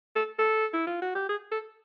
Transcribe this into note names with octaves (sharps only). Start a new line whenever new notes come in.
A4
A4
E4
F4
F#4
G4
G#4
A4